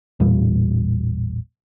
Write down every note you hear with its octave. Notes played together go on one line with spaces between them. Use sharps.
A1 E2 A#2 G3